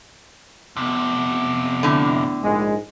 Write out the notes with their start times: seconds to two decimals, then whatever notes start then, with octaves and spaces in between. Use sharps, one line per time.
0.77 F2 C3 B3
1.83 A2 D3
2.43 A#1 G#2 G#3